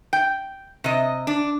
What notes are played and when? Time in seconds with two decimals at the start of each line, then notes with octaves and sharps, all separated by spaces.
0.13 G5
0.84 C3 D#5
1.27 D4